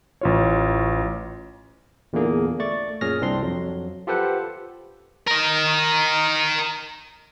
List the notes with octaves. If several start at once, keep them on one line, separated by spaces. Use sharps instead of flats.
A1 F4 C#5
E2 A#2 D3 A#3 G#4
A3 D5 C#6 A6
F#2 A#2 G#4 C#5 F6 A#6
C2 C4 D4 C6
F2 F#3
F4 G4 A4 B4 C5 F#5
A#4 D#5